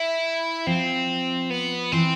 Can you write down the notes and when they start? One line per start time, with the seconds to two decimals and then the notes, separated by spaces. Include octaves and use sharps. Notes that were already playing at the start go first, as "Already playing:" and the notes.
Already playing: E4
0.67 F3 C4
1.50 B3
1.92 E3 C4